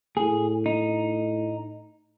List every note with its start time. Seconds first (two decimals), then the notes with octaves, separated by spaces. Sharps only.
0.17 A2 G#4
0.66 D#4